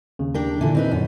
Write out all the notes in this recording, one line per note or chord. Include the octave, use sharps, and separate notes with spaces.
D#2 C#3
D4 G4 A#4
A#2 D3 E3
C4 D#4 B4
F#2